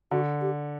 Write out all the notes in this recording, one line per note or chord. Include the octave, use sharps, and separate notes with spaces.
D3 F#4
G4